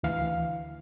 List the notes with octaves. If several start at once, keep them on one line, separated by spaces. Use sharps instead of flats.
D2 E3 F5